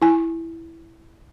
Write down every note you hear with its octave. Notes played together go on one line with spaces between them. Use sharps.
E4 G#5